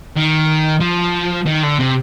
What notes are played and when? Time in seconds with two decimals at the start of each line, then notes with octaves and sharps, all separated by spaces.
0.16 D#3
0.80 F3
1.46 D#3
1.63 D3
1.79 C3